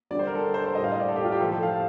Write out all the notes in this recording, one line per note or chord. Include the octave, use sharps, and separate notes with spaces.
D3 G3 D5
C5
A#4
A4
C5
C5
A2 G3 D#5
F5
D#5
D5
A4
G4
F4
G4
A2 F3 A3 A4
A4
F5
F5